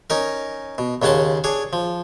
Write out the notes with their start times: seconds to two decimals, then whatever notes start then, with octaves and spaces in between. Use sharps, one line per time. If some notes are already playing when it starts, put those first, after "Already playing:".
0.10 C#4 D#4 A#4
0.78 B2
1.02 D#2 C#3 C#4 F#5 A5 C6
1.44 D4 G#4 C#5
1.73 F3